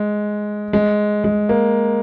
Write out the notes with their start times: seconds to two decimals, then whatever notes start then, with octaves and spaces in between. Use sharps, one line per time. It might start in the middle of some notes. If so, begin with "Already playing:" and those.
Already playing: G#3
0.73 G#3
1.24 G#3
1.49 A#3